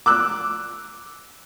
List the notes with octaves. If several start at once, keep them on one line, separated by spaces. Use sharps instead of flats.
D6 E6 F#6